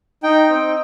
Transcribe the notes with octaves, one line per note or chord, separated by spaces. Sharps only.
D#4 G5
C4